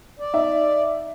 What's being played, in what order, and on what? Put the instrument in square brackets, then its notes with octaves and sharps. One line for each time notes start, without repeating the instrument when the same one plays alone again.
[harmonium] D5
[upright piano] D#4 E5